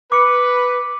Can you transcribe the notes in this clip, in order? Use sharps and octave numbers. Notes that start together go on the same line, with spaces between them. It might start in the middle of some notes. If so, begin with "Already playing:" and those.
B4 D6 C#7